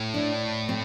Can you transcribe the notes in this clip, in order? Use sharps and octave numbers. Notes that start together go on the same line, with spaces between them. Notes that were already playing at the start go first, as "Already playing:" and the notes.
Already playing: A2
D4
C4